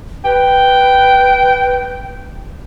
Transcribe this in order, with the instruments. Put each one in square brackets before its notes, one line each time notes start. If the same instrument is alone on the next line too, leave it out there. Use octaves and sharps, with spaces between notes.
[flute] B4 [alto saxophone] G5